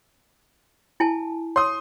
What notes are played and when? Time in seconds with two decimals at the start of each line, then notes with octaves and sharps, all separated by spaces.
1.00 E4 G#5 A5
1.56 C#5 C6 D#6